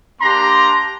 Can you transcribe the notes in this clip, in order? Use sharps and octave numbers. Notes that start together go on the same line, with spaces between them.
A#3 D4 G4 A#5 C6